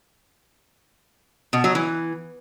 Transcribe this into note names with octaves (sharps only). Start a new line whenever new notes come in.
B2
F#3
E3